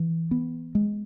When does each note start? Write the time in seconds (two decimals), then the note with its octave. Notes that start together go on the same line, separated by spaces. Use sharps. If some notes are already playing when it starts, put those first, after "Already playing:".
Already playing: E3
0.31 B3
0.75 G#3